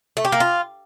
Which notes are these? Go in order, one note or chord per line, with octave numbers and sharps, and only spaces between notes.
A3
G4
A#3
F4